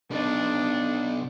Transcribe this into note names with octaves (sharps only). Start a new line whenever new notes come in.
B2 D4 D#4